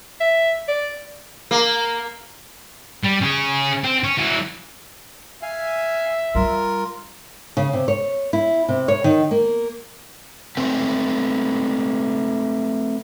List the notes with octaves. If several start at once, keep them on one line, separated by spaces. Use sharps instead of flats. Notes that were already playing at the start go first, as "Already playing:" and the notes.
E5
D5
A#3
G3
C#4 G#4
C4
C#4
E3 F#4
E5 F5 G#5
G3 F4 A#4
C#3
C3
C#5
E4
C3
C#5
D#3
A#3
A3 C4 B4 G#5